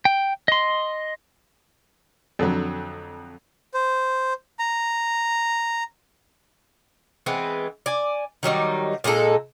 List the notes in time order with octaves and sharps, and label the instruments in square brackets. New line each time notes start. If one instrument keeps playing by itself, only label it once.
[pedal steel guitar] G5
D#5 C6
[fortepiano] F2 D3 F#3
[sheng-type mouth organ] C5
A#5
[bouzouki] E3 G#3 B3 C4
D5 G#5
D#3 F#3 G3 D#4
A#2 G#3 D#4 A4